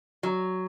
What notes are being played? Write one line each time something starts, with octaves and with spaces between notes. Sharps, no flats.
F#3